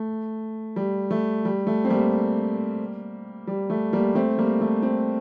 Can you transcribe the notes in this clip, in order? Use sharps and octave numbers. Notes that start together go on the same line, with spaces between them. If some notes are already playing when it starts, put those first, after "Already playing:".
Already playing: A3
G3
A3
G3
A3
C4
G3 A#3
G3
A3
G3 A#3
A3 C4
G3 A#3
A3
A3 C4